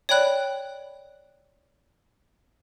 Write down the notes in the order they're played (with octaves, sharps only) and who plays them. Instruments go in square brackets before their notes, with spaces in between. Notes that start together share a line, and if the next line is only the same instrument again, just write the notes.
[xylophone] C#5 D5 G5 B5 F#6